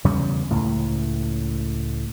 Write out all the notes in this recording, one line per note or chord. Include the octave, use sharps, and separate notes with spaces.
E2 C#3 G3 C#4
C#2 A2